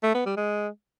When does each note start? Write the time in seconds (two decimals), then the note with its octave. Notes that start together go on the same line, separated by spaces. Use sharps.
0.03 A3
0.14 B3
0.26 G3
0.37 G#3